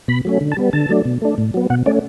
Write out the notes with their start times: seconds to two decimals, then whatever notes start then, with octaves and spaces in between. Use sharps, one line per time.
0.08 B2 B5
0.25 F#3 A3 C#4
0.41 D3
0.52 A5
0.57 G3 B3
0.73 D3 A5
0.89 F#3 A3 D4
1.05 B2
1.22 A3 D4
1.38 A2
1.54 F#3 B3
1.70 B2 F#5
1.86 A3 C#4 D5